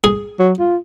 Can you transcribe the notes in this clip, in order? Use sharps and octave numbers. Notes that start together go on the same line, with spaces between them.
G#4
F#3
F4